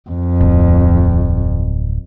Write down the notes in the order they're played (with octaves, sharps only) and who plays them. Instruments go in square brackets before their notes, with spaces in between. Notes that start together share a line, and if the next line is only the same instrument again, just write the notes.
[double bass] F2
[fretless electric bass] D1